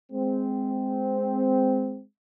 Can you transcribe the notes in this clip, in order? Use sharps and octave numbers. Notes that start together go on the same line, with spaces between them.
G#3 C4